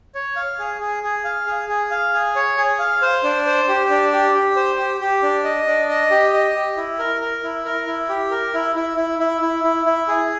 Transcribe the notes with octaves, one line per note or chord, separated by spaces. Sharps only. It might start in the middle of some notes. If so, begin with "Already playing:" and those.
C#5
F5
G#4
G#4
G#4
F5
G#4
G#4
F5
G#4
C#5
G#4
F5
C5
D4
C5
G4
D4
G4
G4
C5
G4
G4
D4
D#5
D4
D#5
G4
D#5
G4
E4
A#4
A#4
E4
A#4
E4
G4
A#4
E4
E4
E4
E4
E4
E4
E4
G#4